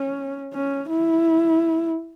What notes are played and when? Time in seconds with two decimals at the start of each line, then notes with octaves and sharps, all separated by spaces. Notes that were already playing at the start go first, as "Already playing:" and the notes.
Already playing: C#4
0.53 C#4
0.90 E4